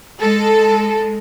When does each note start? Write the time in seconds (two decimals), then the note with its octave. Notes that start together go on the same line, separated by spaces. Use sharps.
0.20 G#3 A4